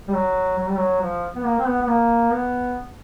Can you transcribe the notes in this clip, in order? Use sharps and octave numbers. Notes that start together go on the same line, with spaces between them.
G3
F#3
F#3
G3
F#3
F3
B3
A#3
C4
B3
B3
A#3
B3